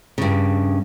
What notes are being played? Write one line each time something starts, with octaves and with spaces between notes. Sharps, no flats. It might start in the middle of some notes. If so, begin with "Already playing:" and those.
G2 C#3